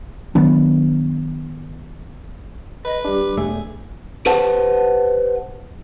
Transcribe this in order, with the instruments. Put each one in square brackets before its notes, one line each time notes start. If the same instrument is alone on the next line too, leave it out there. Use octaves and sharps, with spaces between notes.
[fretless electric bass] D#3 F#3 B3 D4
[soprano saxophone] B4 [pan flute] D#5
[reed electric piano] G3 D4 [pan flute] G4
[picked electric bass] E1 A3 [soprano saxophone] G#4
[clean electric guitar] G4 B4 C5 F#5 A5